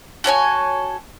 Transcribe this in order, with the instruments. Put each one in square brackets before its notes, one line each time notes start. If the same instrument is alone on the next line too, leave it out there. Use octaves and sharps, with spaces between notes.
[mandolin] F#4 A4 C#5 G#5